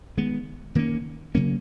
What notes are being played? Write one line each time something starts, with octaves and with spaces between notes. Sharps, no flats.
D#3 G#3 B3
D#3 A#3 C#4
C#3 F#3 A#3 C#4